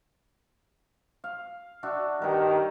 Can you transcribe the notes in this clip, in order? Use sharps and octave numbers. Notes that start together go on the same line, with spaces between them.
F5
D4 F#4 E5
G2 D#3 A#4 G5 C#6